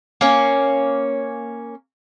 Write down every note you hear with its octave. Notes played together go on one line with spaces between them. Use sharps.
A#3 C#4